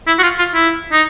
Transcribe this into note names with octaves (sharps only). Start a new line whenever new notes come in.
E4
F#4
F4
F4
E4
D#4